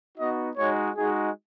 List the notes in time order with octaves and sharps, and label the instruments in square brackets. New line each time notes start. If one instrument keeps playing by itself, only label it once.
[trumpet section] B3 D#4 F#4 D#5
G#3 D#4 F#4 C#5
G#3 D#4 F#4 G#4